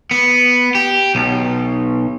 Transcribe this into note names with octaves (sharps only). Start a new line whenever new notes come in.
B3
G4
B1